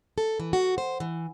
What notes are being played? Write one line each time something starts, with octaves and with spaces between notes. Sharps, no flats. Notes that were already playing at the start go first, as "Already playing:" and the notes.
A4
E3
F#4
C5
E3